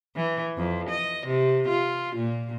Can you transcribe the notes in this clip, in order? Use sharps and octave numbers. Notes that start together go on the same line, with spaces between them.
E3
F2
D#5
C3
F4
A#2